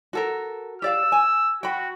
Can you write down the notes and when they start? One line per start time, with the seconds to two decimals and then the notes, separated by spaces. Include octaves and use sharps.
0.13 F#4 A4 A#4
0.82 G4 D5 F5 E6
1.12 G#5
1.63 F#4 G5 B5